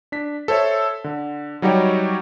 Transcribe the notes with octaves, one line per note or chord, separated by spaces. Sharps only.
D4 B6
A4 C5 C#5 E5
D3
F#3 G3 D#4 F#4 G4 C#5